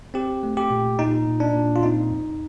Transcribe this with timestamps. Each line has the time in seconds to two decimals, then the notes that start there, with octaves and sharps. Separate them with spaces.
0.14 C4 G4
0.43 A3
0.57 G4
0.71 A#2
0.99 A#2 D#4
1.27 A#2
1.40 D4
1.55 A#2
1.76 F4
1.83 C4 D#4
2.11 F2